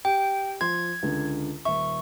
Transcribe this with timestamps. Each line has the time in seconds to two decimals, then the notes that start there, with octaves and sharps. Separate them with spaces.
0.05 G4 G5
0.61 F3 C6 G#6
1.03 C#2 D3
1.65 D#1 E5 C#6